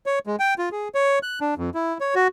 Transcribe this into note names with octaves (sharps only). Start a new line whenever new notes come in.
C#5
G#3
G5
F4
G#4
C#5
F#6
D4
F2
E4
C#5
F#4